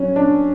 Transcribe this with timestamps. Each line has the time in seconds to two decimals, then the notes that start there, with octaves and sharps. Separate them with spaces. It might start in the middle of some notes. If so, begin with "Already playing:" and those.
Already playing: F#3 C#4
0.16 D4